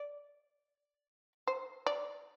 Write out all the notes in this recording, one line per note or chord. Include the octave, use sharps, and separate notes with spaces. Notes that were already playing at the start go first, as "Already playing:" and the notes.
Already playing: D5
C5
D5